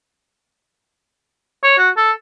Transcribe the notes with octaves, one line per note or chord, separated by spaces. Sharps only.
C#5
F#4
A4